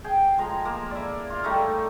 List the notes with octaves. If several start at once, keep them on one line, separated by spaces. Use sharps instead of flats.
G#4 G5
F3 G#3 A#5
A#3
E4 D5
F4 F5
G3 A3 D#4 E4